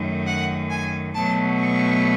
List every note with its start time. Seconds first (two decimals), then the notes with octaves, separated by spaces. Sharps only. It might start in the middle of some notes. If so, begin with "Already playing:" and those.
Already playing: F#2 D#3 A3
0.26 F#5
0.69 G#5
1.14 B2 F#3 A3 A5
1.59 C#6